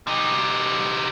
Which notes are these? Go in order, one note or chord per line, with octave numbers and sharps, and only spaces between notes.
C3 D#4